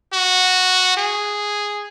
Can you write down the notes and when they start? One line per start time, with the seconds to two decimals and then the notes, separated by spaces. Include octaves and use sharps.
0.13 F#4
0.97 G#4